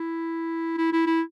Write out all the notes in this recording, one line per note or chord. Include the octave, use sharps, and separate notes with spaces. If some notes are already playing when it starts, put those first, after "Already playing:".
Already playing: E4
E4
E4
E4